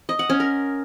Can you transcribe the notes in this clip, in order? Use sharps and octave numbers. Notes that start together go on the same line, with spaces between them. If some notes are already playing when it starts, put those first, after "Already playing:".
D#5
F#5
C#4
A#4